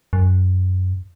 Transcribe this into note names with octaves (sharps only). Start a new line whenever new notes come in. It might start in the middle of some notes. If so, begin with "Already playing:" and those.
F#2